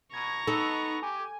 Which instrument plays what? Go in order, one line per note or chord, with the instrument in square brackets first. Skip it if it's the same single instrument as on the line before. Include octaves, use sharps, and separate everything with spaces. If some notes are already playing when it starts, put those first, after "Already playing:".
[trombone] B2 [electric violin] A#5 C#6 [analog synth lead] G#6
[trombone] B3 [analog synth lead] D#4 [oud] A4
[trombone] G4 [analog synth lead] G#5